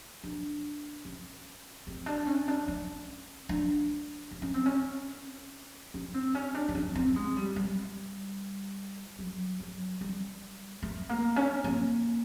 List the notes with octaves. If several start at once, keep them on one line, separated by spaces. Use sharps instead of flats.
D4
C#4
C4
D4
C#4
D4
C#4
D4
D4
C#4
C4
C#4
C#4
C4
C#4
D4
D4
C#4
C4
G#3
G3
G3
F#3
F#3
G3
A3
A#3
C#4
A#3